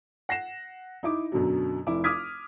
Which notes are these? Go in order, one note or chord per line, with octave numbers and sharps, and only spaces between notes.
F#5 A#6 C7 E7
D#4 E4 D6
F#2 B2 D3 F#3
F1 E4 D6
D6 D#6 F6 G#6 B6